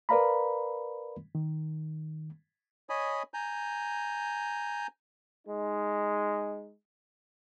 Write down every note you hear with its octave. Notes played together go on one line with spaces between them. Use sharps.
A#4 B4 D5 F5 A#5 B5
D#3
C#5 D#5 G#5 B5 D#6
G#5 A#5 G6
G#3 D#4